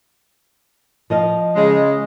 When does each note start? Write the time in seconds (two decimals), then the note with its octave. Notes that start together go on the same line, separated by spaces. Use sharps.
1.10 F3 D#5 F5
1.55 C#3 G#3